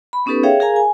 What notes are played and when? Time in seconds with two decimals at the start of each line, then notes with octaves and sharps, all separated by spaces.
0.13 B5
0.26 B3 C#4 D#4 G4 A4 B4
0.43 G#4 C#5 E5 F5 G5
0.60 G#4 A#4 F5 G#5 A#5
0.76 G#5